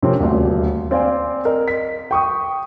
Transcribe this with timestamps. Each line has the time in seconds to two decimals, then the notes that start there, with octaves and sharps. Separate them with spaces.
0.03 C3 F3 A#3 C4 C#4
0.19 D#1 D2
0.91 C4 C5 D5 F5 G#5
1.45 A#4 D#5
1.68 B6
2.11 G5 C#6 D#6